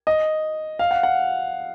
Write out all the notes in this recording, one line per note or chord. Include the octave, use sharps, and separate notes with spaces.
D#5
F5
F#5
F#5